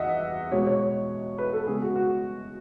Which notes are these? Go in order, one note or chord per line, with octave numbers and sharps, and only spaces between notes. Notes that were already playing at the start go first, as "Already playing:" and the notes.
Already playing: E2 D#5 E5 F#5
B2 G#3 B3 C#5
C#5
B4
A4
C#3 G#3 B3 G#4
F#4
F#4